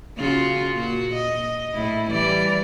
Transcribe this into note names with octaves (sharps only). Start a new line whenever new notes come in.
C#3 F4 F#4
A#2 F#4
D#5
A2 E4
E3 G3 D5